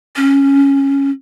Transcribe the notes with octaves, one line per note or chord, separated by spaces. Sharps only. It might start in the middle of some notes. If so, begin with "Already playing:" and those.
C#4